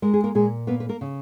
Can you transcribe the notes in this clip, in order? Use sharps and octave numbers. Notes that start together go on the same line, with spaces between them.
G#3 A#4
G#4
A#3 A#4
A#2 G#3 G#4
A#3 B3 B4
B4
A#3 A#4
C#3